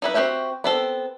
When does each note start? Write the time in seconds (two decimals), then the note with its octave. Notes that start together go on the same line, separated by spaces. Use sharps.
0.02 D#4 E4 B4
0.14 C4 E4 F#4 G4 E5
0.64 B3 C4 A4